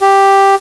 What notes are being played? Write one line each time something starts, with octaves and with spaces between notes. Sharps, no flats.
G4